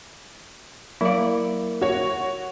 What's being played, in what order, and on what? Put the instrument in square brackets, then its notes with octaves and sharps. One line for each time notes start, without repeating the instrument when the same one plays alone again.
[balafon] F#3 F5 [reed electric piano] A#3 A#4 [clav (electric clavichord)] E4 D5
[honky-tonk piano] F#4 C#5